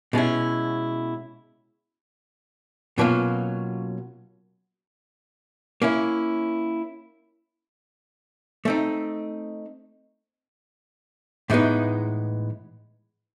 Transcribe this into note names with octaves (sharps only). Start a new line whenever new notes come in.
B2 G#3 C#4 E4
B2 F#3 A#3 C#4 F4
A#3 C#4 E4
A3 C4 D#4
A2 E3 G#3 B3 D#4